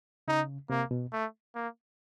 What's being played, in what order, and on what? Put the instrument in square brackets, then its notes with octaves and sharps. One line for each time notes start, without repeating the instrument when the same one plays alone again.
[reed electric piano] C#3 [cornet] D#4
[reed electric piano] C3 [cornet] A#3
[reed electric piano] B2
[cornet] A3
A#3